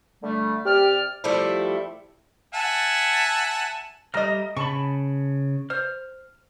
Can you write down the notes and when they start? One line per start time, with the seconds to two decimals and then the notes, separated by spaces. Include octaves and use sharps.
0.23 D3 G3 A3
0.66 C3 G4 D5 F6
1.24 F3 G3 A3 E4
2.54 E5 F#5 G#5 A5
4.14 G3 A3 D#5 A#5 F6
4.56 C#3 A5 B5 C#6
5.70 C5 F6